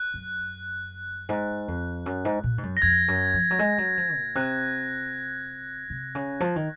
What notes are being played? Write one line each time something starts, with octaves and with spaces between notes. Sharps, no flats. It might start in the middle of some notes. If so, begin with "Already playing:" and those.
Already playing: F#6
F#2
G#2
F2
F#2
G#2
A#2
G#2
F#2
A#6
F2 G#6
F#2
F3
F#3
G#3
F#3
F3
A#2
C3 F#6
C3
C#3
F3
D#3